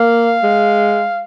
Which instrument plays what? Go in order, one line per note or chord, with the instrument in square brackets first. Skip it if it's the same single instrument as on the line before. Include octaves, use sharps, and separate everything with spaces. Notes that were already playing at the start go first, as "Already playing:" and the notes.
Already playing: [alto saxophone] A#3 [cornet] F5
[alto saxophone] G#3